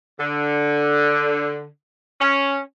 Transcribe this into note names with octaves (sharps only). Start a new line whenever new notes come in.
D3
C#4